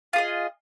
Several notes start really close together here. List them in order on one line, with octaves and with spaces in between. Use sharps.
F4 G#4 D#5